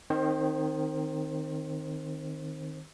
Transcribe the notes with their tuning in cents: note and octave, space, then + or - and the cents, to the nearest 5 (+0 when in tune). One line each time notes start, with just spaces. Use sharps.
D#3 -10 C4 +0 C5 +25